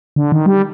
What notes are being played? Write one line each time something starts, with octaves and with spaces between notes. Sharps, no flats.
D3
D#3
G3